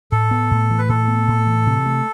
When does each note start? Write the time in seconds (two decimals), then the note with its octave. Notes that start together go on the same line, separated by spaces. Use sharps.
0.11 A2 A4
0.31 B3
0.51 A2
0.71 E3
0.78 B4
0.89 A2 A4
1.08 B3
1.28 A2
1.47 E3
1.67 C3
1.86 A3